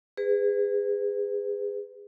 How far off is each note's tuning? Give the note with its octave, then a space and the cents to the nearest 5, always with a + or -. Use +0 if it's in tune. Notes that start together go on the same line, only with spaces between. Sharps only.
G#4 -25 B4 +30